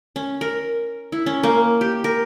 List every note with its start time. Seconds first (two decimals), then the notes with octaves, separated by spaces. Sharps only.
0.16 C#4
0.41 A#4
1.12 E4
1.26 C#4
1.43 A#3
1.81 G4
2.04 A#4